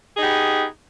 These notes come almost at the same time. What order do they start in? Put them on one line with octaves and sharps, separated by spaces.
G#4 D#4 G4 B3